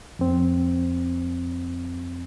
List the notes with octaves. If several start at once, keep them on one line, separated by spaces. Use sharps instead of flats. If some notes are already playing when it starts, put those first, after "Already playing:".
F2 C4